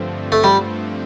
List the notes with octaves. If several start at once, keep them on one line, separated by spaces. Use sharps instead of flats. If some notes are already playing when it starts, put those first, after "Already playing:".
Already playing: G2 D3 F3 A3 C4
A3
G3